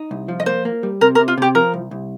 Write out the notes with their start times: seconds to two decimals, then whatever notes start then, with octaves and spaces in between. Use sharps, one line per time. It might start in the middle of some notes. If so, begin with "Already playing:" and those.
Already playing: D#4
0.11 C2
0.28 F3
0.40 D#5
0.46 A#3 C5
0.65 A#3
0.83 G3
1.01 C3 A#4
1.15 A#4
1.19 C3
1.28 F4
1.38 C3 G4
1.55 F3 A#4
1.74 C2
1.91 C2